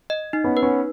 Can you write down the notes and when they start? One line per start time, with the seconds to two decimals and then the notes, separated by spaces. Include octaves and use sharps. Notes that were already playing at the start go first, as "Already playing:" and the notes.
0.10 D#5
0.33 D#4
0.44 B3 C#4
0.57 B4
0.62 B3 C#4